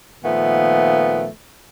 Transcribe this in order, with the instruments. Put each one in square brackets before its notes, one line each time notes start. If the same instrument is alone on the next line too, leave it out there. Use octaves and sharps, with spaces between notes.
[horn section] A#2 D#3 F3 A3 B3